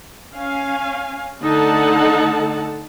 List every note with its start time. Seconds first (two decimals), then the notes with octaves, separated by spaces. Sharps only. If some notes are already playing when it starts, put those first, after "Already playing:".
0.36 C#4 F5 G#5
1.41 D3 A3 D#4 A4 F#5 A5